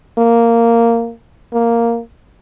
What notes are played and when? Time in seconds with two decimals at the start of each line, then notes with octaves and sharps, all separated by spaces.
0.18 A#3
1.53 A#3